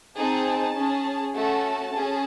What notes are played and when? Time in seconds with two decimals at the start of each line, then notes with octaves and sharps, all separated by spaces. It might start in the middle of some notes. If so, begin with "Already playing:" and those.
0.17 C4 D#4 G#4 A5
0.76 C#4 G#4
1.35 A3 C#4 F#4 A4 A5
1.94 C#4 G#4